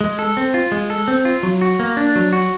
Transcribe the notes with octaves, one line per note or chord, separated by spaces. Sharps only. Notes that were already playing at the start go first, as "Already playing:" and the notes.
G#3
A4
C4
F4
G#3
A4
C4
F4
F#3
F#4
A#3
D4
F#3
F#4